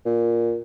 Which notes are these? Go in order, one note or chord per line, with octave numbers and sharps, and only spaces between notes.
A#2